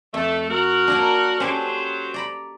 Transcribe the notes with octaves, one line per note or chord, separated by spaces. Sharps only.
F2 A3
F#4 A#4
F#3 A#3 D4
F#3 C#4 G4 A4 C5
D5 A#5 B5